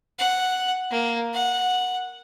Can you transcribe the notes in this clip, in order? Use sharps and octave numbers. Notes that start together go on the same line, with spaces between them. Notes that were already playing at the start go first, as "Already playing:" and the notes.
F#5
A#3
F#5